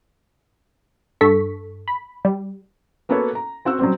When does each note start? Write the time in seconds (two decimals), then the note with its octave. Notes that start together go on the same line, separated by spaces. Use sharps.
1.21 G2 A4 C#6 B6
1.88 B5
2.25 G3
3.09 A#3 B3 F#4 A4 B4 C#5
3.35 A#5
3.65 C4 F#4 F#5 E6
3.79 F#3 G3 C4